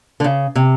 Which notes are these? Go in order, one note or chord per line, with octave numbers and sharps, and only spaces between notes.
D3
C#3
C3